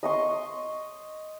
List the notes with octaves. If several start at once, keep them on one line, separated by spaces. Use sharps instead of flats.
D#5 C6 C#6